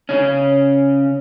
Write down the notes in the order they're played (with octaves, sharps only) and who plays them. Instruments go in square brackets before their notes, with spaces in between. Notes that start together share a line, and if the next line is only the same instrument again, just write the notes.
[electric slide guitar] C#3 C#4